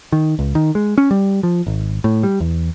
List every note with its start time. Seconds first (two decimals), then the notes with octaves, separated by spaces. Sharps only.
0.12 D#3
0.39 C#2
0.55 D#3
0.75 G#3
0.98 C#4
1.11 G3
1.43 F3
1.67 G#1
2.04 A2
2.23 G3
2.40 E2